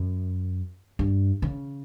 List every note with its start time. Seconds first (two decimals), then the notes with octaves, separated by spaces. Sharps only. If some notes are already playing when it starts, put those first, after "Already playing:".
Already playing: F#2
0.99 G2
1.42 C#3